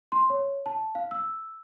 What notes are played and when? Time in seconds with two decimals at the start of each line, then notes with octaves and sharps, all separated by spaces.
0.12 C6
0.30 C#5
0.66 A5
0.95 F5
1.11 E6